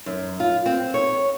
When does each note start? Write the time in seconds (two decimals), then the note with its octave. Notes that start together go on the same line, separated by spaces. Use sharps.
0.06 F#2
0.40 F4
0.66 C4
0.94 C#5